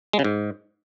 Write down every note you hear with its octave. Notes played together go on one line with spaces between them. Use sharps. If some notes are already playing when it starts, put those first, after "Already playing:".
G#3
C#3
G#2